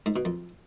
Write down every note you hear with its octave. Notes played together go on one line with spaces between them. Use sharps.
G#2
B2
F2